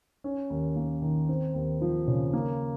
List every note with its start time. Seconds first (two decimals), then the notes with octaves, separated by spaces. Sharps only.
0.24 C#4
0.50 D#2
0.76 A#3
1.02 D#3
1.29 C4
1.54 D#2
1.82 F3
2.08 C#3
2.33 A#3